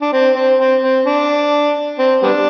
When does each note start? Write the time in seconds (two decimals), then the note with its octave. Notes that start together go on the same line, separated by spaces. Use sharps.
0.02 D4
0.13 C4
0.35 C4
0.59 C4
0.82 C4
1.06 D4
1.99 C4
2.23 G3 B3 D4